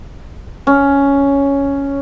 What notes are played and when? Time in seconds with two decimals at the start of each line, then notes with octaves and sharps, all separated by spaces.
0.67 C#4